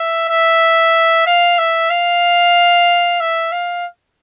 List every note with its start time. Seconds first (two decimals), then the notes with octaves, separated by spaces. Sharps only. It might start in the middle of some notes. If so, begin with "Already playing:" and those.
Already playing: E5
0.29 E5
1.27 F5
1.58 E5
1.90 F5
3.20 E5
3.52 F5